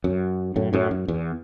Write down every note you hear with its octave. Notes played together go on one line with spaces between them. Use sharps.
F#2
F#2 A2
F#2 A2
F#2
E2